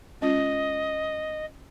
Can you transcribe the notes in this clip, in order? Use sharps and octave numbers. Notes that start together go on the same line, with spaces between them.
G#3 C#4 F4 D#5